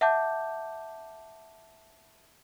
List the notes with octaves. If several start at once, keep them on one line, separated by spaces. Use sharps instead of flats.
E5 F#5 A5 D6 G6